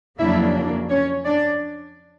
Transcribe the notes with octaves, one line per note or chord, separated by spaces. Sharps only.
F2 C#3 F#3 A#3 D4 E4 E5
C#4 C#5
D4 D5